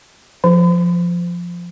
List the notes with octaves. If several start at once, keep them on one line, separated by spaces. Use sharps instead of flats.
F3